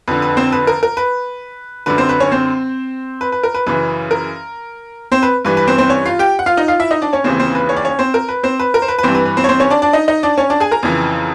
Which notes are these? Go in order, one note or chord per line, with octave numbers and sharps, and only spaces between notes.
F2 D3 B4
B4
C4 C5
B4
A#4
A#4
B4
F#2 D3 B4
C4 C5
B4
C#4 C#5
C4 C5
B4
B4
A#4
B4
F#2 C#3 E3 B4
A#4
C4 C5
B4
G2 E3 B4
B4
C4 C5
C4 C5
C#4 C#5
F4 F5
G4 G5
F#5
F4 F5
D#4 D#5
F4 F5
E4 E5
D#4 D#5
D4 D5
C#4 C#5
D#2 C#3 E3 C4 C5
C4 C5
B4
C#4 C#5
D5
C#4 C#5
C4 C5
A#4
B4
C4 C5
B4
A#4
C5
B4
B4
G2 E3 C4 C5
B4
B4
C4 C5
C#5
C4 C5
C#4 C#5
D4 D5
D4 D5
D#4 D#5
D#4 D#5
D4 D5
C#4 C#5
D4 D5
G#4 G#5
A#4 A#5
F2 C#3 E3